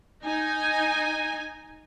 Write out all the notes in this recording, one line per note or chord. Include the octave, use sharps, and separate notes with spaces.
D#4 G#5